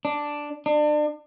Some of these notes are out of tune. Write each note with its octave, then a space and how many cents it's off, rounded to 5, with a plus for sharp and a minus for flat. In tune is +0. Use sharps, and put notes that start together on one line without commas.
D4 +0
D4 +35